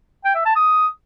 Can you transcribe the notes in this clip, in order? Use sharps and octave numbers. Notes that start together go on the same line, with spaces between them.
G5
E5
A5
D#6